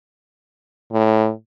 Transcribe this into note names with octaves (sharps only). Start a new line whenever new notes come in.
A2